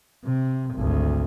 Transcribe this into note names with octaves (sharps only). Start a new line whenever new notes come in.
C3
G#1 D2